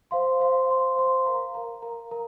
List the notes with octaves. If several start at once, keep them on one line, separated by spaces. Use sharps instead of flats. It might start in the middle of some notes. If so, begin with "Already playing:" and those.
C5 F5 C6
C5 F5 C6
C5 F5 C6
C5 F5 C6
A#4 F5 A#5
A#4 F5 A#5
A#4 F5 A#5
A#4 F5 A#5